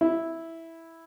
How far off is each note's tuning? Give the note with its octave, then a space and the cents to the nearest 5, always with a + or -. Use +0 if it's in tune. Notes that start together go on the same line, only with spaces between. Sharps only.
E4 -5